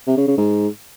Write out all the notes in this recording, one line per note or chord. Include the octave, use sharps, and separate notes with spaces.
C3
C#3
C#3
G#2